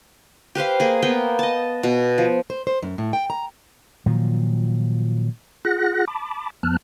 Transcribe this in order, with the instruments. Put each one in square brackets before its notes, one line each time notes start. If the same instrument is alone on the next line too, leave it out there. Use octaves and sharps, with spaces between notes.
[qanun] G4 B4 C5 F5
A#3 G#4
A#3 B3 G5
D#5 A5
B2
F3
[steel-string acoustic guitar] C5
C5
F#2
A2
G5
A#5
[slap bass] A#2 D#3 F3 F#3
[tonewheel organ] F4 G#4 F#5 F#6 A#6
A5 B5 D6
F2 F3 B3 A5 F6 F#6